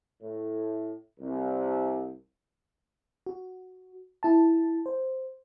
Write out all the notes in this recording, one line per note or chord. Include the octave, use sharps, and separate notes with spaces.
A2
C2
F#4
E4 A5
C5